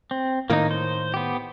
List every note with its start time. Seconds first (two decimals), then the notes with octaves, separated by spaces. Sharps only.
0.11 C4
0.50 A2 D#3 A#3 D#4
0.71 C5
1.14 B3 G4